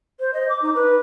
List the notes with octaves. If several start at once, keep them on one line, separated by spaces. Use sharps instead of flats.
C5
D#5
D6
D#4
B4